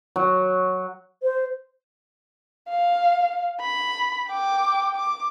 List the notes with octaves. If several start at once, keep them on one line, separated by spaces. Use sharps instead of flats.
F#3
C5
F5
B5
G5 D6
D6